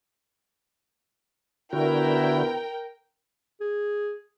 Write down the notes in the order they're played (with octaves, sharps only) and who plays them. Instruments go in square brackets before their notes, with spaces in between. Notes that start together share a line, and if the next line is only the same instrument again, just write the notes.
[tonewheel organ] D3 F#4 [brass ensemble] B3 E4 [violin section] A#4 G5
[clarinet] G#4